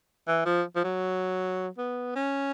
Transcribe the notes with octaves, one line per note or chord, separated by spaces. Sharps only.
E3
F3
F3
F#3
B3
C#4